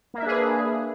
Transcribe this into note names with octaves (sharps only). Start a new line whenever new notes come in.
A#3 D4 G#4 B4 E5